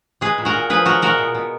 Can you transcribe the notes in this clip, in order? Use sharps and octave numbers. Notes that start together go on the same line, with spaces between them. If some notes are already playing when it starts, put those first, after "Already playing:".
G#3 G#4 B4
A#2
F#4 A#4
A#2
F3 G#4 B4
G#3 F#4 A#4
A#2 F#4 A#4
B2
B2